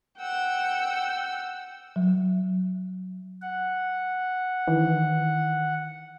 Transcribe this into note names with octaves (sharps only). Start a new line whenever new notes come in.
F#5 G5 E6
F#3
F#5
D#3 E3